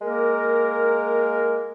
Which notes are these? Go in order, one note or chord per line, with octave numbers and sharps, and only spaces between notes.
G#3 A#3 A#4